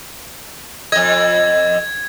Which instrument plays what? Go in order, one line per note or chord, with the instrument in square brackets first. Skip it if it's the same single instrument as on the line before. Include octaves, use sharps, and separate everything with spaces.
[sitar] F2 D#5 [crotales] G#6